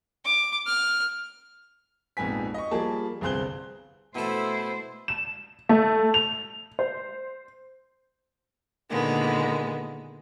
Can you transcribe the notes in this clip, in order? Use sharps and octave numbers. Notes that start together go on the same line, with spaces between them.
D6
F6
A#1 F2 G#2 B3 G#5 B6
D#5 C#6
F3 G3 A#3 G#4 A5
G1 C2 G#4 C5 F#6 G7
B2 A3 E4 A4 C5
E7
A3
F7
C5
A#2 D3 D#3 G#3 B3